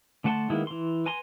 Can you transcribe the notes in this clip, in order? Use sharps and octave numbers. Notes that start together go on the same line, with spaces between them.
D3 A3 F#5 A5 C6
D#3 G#3 A#3 B3 E4
E3 C6
B4 G#5 A#5 C6